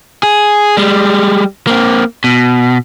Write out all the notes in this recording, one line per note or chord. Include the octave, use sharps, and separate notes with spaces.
G#4
G3 G#3
A#3 C4
B2